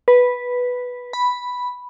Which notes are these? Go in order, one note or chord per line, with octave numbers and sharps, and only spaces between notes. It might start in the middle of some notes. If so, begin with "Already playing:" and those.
B4
B5